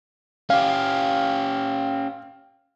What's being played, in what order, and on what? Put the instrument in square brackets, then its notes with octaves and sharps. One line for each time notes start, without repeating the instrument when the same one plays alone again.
[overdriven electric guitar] C#4 G4 [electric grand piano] F5